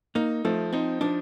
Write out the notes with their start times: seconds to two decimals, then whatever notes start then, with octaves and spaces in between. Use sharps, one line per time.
0.15 A#3 D#4
0.45 F3 A3
0.73 C4 D#4
1.01 F3 D4